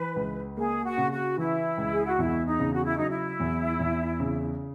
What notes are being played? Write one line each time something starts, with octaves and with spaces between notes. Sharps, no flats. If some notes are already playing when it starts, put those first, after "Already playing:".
Already playing: E3 B4
C#2
A#3 G#4
F#4
C#3
F#4
E3 E4
C#2
G#4
F#4
E2 E4
D#4
C#3
F#4
E4
F#3 D#4
E4
E2
E2
C#3